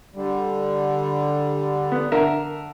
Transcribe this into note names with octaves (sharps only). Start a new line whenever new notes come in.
D3 G3
B3
D3 A#4 E5